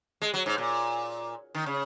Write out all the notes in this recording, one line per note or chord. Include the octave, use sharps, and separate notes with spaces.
G#3
F#3
G#2
A#2
D#3
C#3